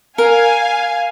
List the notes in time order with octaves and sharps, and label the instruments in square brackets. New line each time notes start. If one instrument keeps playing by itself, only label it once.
[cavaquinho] A#4 [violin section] F5 G#5